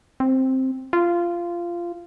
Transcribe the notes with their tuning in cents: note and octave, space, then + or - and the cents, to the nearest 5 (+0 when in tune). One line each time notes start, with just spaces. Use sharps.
C4 +5
F4 -15